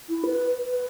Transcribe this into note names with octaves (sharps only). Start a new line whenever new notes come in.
E4
B4
B4